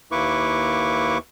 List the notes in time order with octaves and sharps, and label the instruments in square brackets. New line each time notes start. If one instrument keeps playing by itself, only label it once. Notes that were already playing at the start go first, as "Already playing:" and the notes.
[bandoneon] D#2 A#3 E4 B4 C#6 D6